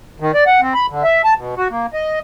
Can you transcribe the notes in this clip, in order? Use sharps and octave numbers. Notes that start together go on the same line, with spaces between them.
D#3
D5
F#5
C4
B5
D3
E5
A5
B2
F#4
A#3
D#5